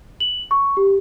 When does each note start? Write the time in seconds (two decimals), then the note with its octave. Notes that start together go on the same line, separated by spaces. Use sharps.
0.20 F#7
0.51 C#6
0.77 G4